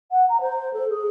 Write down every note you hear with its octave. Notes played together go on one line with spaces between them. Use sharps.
F#5
A#5
C5
A4
G#4